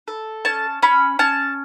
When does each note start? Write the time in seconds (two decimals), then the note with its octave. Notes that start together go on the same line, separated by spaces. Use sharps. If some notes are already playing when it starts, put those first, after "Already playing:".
0.08 A4
0.45 C#4 A5
0.82 C#4 B5
1.19 C#4 A5